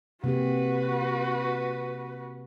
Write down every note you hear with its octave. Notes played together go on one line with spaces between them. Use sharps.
C3 A#3 F#4 G4 B4